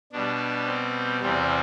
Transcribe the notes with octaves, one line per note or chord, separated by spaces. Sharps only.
B2 G3 D4
C4
E2 C3 E3 G3 C4